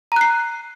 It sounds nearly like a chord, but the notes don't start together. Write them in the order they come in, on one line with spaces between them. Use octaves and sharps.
A#5 F#6 C7